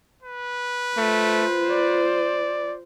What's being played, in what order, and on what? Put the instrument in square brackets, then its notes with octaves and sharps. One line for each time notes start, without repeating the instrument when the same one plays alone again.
[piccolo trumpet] B4
[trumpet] A3 [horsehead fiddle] F4 C5
[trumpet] D5